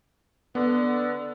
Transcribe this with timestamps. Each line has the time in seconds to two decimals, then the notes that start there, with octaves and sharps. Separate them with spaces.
0.55 D3 B3